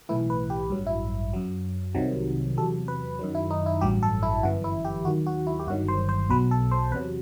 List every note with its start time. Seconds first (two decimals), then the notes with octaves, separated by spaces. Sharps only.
0.09 B1 A2 E3 E4
0.30 B4
0.50 G4
0.70 A1 G2 F#3
0.86 E4
1.33 F#2 F#3
1.95 C2 C3 D#3 F#3
2.57 E2 C3 F#3 A4
2.88 B4
3.19 F#2 D#3 F#3
3.35 E4
3.51 D#4
3.66 E4
3.81 A1 G2 F#3 G4
4.03 A4
4.23 E4
4.43 G1 F#2 E3 F#4
4.64 E4
4.85 G4
5.05 D#2 D#3 F#3 F#4
5.27 F#4
5.47 E4
5.59 G4
5.67 G1 G2 D#3 F#3 F#4
5.88 C5
6.09 C5
6.30 B1 B2 F#3 B4
6.51 A4
6.71 C5
6.91 E2 B4
6.95 C3 F#3